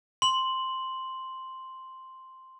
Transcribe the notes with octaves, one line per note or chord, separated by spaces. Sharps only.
C6 F#7